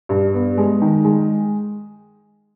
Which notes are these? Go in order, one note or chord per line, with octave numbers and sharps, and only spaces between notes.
G2
B3
G#3
D#3
G#3